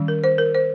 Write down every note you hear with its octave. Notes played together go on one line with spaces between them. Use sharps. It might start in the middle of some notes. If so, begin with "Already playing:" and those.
Already playing: D#3 G3 C#4
A#4
C5
A#4
C5